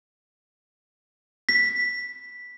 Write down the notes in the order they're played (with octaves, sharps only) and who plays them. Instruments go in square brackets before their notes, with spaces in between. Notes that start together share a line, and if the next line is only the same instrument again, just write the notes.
[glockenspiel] B6